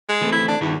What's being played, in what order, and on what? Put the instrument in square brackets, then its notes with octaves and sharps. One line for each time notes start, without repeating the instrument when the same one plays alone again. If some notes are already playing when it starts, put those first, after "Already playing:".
[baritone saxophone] G#3
[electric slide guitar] E3 A3 C4
[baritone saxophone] E4
D4
[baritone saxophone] E2 [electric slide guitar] G2 D#3 E4